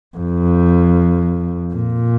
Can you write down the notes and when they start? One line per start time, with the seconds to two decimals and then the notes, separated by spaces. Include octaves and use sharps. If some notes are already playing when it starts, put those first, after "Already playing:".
0.17 F2
1.74 A#2